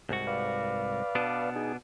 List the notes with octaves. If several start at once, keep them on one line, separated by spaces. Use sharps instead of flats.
C2 G#2 F#4
B4 D5 F5
B2 B3 D4
D#4 G#4